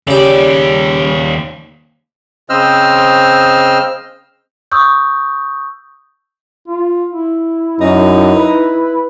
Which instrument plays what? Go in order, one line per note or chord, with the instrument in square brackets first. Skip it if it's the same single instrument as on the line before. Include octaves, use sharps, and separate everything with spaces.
[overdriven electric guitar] D#2 D5 [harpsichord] C#3 G4
[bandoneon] C#3 C4 C5 D#5 E6 F6
[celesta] C#6 D#6 E6 G6
[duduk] F4
E4
[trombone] F#2 [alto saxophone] D#4
[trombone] B4